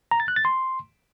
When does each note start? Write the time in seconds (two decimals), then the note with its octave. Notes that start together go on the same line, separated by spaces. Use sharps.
0.11 A#5
0.20 A6
0.28 F#6
0.36 A6
0.45 C6